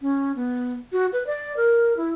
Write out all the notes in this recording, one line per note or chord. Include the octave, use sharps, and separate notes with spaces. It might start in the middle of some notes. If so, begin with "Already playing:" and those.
C#4
B3
F#4
B4
D5
A#4
E4